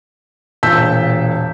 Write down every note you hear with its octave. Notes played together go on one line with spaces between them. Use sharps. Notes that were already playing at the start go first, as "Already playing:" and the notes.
E1 A#2 A5 E6 G6 B6